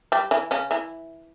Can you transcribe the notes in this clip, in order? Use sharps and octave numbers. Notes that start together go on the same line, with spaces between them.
G3 G4
E3 E4
C#3 C#4
E3 E4